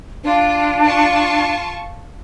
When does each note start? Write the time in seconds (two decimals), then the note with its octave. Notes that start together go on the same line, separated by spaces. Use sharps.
0.24 D4 F4
0.83 F4 A5 C#6